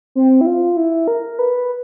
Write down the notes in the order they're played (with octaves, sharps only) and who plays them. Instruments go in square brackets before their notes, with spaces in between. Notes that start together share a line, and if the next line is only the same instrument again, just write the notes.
[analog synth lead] C4
E4
F4
E4
A#4
B4